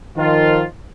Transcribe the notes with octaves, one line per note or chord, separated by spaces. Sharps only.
D#3 F3 F4